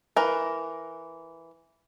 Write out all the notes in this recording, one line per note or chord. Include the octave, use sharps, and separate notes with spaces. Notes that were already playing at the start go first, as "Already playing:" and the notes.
E3 A#4